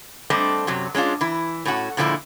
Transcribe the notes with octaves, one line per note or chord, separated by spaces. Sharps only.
G3 A3 C4 D4 D#5
F#2 C3 F#3
G#3 C#4 D4 F4
E3 E4
A2 C#4 F#4
A#2 D3 F3 G#3 D4 E4